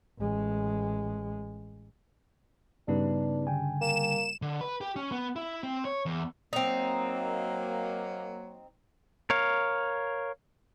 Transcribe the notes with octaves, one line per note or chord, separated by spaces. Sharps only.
A1 G#3
G2 C#3 G3 B3 D4 D#4 B4
D3 G5 G#5
A#3 E7
D3
B4
G4
C#4
B3
E4
C4
C#5
E2
F#3 A#3 C4 D#4
A#4 C#5 F5